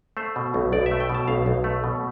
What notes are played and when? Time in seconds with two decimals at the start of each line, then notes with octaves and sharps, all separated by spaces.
0.17 A3 C5
0.36 B2
0.54 B1
0.72 B1 D5
0.86 E5
0.91 A3
1.00 G5
1.10 B2
1.15 A5
1.28 B1 F5
1.46 B1
1.64 A3
1.84 B2